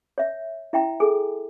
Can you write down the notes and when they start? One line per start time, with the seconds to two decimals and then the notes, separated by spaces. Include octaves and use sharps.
0.18 C#5 E5
0.73 E4 E5 G5 A#5
1.00 G#4 A4 G#5